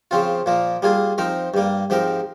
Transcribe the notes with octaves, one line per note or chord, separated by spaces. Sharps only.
C#3 F3 C4 F4
A#2 F3 A#3
G3 A#3 F4 G#4
F3 C4 D#4 A#4
G2 G3 A#3
G#2 F3 C4 G4 A#4